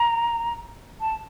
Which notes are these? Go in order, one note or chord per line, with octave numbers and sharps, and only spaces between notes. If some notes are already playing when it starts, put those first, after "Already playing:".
Already playing: A#5
A5